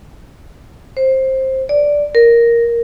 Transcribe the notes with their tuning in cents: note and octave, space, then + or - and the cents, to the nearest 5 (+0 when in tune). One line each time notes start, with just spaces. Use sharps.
C5 +15
D5 -5
A#4 +0